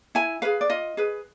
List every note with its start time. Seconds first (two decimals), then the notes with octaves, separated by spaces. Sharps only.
0.15 E4 G#5
0.42 G#4 B4 F5
0.61 D5
0.70 F4 D#5
0.97 G#4 B4